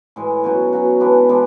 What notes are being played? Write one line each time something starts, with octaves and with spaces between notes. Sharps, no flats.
A2 E3 G#3
B2 F#3 C#4 F#4
B2 F#3 C#4 F#4
E3 G#3 B3 D4
E3 G#3 B3 D4